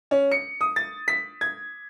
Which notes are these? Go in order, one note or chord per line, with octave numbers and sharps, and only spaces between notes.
C#4
C#7
D#6
A6
B6
G#6